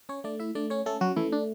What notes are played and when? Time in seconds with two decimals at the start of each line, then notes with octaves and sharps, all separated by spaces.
0.09 C#4 C#5
0.24 A3 D4 D5
0.40 E4 E5
0.55 A3 D4 D5
0.70 C#4 C#5
0.86 A3 C#4 A4
1.01 F#3 F#4
1.16 E3 A3 E4
1.32 D4